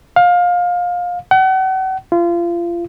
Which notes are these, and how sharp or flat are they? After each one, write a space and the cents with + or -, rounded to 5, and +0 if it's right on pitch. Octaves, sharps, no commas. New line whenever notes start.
F5 +25
F#5 +40
F4 -30